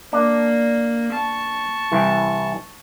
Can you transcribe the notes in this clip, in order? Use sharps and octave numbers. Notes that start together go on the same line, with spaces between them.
A#3 D4
A5 C#6
C2 E3